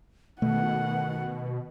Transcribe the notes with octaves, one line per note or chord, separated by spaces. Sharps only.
B2 D#3 A3 F#5